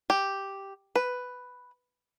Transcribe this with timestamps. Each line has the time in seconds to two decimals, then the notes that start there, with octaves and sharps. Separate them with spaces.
0.10 G4
0.96 B4